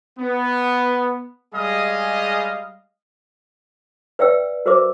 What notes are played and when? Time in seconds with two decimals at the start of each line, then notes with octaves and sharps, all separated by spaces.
0.18 B3
1.54 G3 G#3 G#4 D#5 F5 D#6
4.19 B4 D5 E5 G5 E6
4.66 F#4 A#4 C5 E5 D6